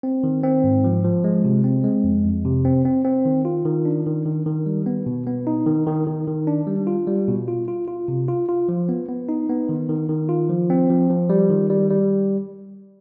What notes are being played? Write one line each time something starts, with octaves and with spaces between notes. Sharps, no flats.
C4
D#3
C4
G#2
F3
F3
G#3
C3
C4
G#3
F2
F2
C3
C4
C4
C4
D#3
F4
D#3
D4
D#3
D#3
D#3
G3
B3
B2
B3
D#4
D#3
D#3
D#3
D#3
D4
G3
F4
G3
B2
F4
F4
F4
C3
F4
F4
F3
B3
B3
D#4
B3
D#3
D#3
D#3
F4
F3
C4
F3
F3
G3
D#3
G3
G3